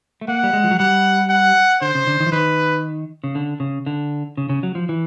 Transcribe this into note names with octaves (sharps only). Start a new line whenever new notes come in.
A3
A#3 F#5
G3
G#3
F3
F#3
G3 F#5
F#5
D3 C5
C#3
D3
D#3
E3
D#3 B4
C#3
D3
C#3
D3
C#3
C#3
F#3
F3
E3